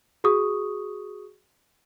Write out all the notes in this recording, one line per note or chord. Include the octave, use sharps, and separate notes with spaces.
F#4 G#4 C#6 D#6